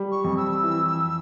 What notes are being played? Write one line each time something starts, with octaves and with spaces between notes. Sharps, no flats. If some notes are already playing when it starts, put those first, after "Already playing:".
Already playing: G3
C#6
F2
E6
E3